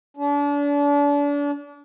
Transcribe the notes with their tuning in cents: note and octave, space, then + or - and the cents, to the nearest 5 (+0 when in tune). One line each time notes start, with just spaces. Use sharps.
D4 -35